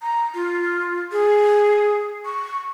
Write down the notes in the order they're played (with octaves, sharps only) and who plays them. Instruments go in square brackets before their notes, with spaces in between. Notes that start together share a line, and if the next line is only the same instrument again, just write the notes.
[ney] A#5
F4
G#4
C#6